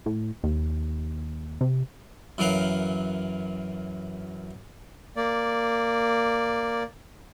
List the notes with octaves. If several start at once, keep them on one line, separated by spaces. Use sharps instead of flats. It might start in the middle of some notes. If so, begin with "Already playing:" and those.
A2
D#2
C3
F#2 E3 F#3 A#4 F5 F#5
A#3 D5